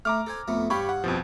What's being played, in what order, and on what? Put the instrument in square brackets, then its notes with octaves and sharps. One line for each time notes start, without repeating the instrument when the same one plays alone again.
[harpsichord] A3 [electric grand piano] A#5 D6 F6
[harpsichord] A4 C5 G#5
F2 A3 B3
[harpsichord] G2 C#5 F5 [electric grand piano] G4 B5 C#6
[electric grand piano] F#5
F2 B2 F3